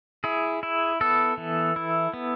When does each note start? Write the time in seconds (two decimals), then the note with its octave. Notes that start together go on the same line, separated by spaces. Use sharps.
0.24 E4 G#4
0.63 E4
1.01 B3 A4
1.37 E3
1.76 E4
2.14 B3